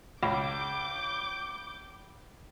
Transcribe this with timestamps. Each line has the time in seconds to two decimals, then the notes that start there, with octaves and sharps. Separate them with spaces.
0.23 C#2 D6 G6